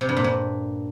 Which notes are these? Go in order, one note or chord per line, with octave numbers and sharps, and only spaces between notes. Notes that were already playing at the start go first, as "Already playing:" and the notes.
C3
G2
A#2
G2